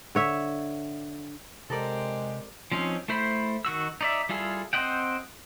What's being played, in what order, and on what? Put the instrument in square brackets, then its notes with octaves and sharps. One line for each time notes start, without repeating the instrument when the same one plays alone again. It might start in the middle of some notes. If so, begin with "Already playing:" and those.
[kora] D3 C#5 E5
[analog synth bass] C3 [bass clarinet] G#3 [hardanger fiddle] C4 G4 [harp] A4 A#4 D5
[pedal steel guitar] F3 C4 C#4 D#4
A3 E4 C5 B5
D#3 F#4 E6
D#4 D5 E5
G3 E4 F4 G#4 A4
C4 C5 D#5 F#5 G5